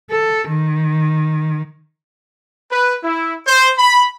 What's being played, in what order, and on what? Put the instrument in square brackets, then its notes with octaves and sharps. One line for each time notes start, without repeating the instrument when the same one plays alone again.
[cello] A4
D#3
[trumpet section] B4
E4
C5
B5